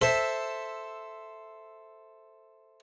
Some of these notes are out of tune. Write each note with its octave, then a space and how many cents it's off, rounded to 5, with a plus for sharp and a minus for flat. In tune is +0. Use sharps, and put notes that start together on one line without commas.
A4 +0 C5 +0 E5 +0